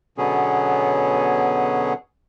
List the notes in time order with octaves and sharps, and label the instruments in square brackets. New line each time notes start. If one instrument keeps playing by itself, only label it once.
[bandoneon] B2 D3 F#3 B3 C#4 G#4